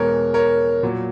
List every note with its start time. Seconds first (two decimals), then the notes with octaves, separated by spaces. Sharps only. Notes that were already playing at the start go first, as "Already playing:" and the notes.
Already playing: E2 B2 G#3 A#4 C#5
0.34 A#4 C#5
0.83 A#2 F#3